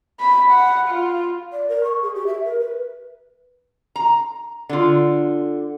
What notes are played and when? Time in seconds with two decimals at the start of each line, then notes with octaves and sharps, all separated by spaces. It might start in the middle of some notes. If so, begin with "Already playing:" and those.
0.20 B5
0.51 F#5
0.88 F4
1.52 D5
1.69 A#4
1.84 C#6
2.03 G#4
2.15 G4
2.27 E5
2.45 A#4
2.60 B4
3.96 A#5
4.69 D3 F4